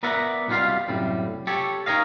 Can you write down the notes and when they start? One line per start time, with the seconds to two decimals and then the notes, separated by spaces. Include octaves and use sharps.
0.03 B3 A#4 B4 D5 E5 F#5
0.48 C2 B2 G3 F4 F5
0.88 F#2 A2 C3 G3
1.47 G4 A4 C#5
1.86 D#4 A#4 C#5 D#5 F5